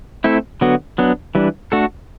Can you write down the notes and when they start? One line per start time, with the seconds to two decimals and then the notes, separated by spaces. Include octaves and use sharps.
0.24 A3 C4 E4 A4
0.61 D3 F#3 B3 F#4
0.98 F#3 B3 D4
1.35 E3 G3 D4
1.72 A3 D4 F#4 A4